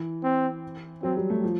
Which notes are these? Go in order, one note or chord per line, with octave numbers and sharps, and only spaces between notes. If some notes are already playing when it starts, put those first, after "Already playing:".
Already playing: E3
C4
F#3 C4
G3
A3
F3